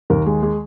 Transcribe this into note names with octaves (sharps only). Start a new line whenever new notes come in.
D#2 A#4
G#3 G#4
G#3 G#4